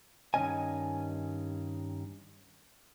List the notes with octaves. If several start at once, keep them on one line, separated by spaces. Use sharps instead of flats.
G2 D#3 E3 C#4 D#5 G#5